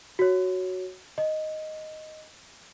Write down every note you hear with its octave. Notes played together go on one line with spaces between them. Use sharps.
F#4 C#5
D#5